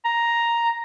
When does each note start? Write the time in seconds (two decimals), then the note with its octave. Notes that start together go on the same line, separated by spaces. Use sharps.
0.05 A#5